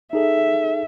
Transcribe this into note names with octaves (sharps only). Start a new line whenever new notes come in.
D#4 G#4 A4 E5